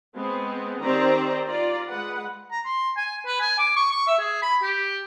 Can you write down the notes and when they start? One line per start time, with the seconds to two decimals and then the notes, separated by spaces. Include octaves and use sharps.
0.15 G#3 B3 C4
0.81 D#3 C4 G4 C5 D5 A#5
1.47 F4 D5 A#5
1.90 G#3 B4 F#5
2.51 A#5
2.65 C6
2.97 G#5
3.26 B4
3.41 G#5
3.58 D6
3.76 C#6
3.91 C#6
4.07 E5
4.19 G#4
4.42 B5
4.63 G4